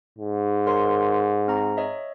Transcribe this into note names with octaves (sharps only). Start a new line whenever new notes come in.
G#2
A#4 C#5 C6
C4 A#5
C#5 D#5 E5